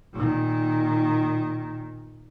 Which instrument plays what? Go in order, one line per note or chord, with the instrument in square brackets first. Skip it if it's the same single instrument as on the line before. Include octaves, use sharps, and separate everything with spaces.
[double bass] A#2 D#3